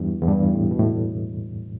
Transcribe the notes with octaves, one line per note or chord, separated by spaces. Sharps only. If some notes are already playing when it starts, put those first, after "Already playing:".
Already playing: E2 G2
E2
G2
A2
B2
A2